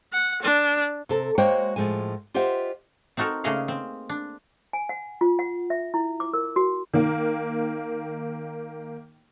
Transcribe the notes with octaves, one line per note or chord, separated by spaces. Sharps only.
F#5
D4
C3 A4 A#4
G#3 A#3 F#4 C5 C#5 G5
A2 F3 G#3 G#5
F4 G4 C5 D#5 E5 F#5
C4 D#4 F#4 A4 A#4
C#3 A3 A#3 G#4 D#5 F5
C4
D4
G#5
F#5
F4
F#5
E5
E4
D6
A#4
F#4
D#3 A#3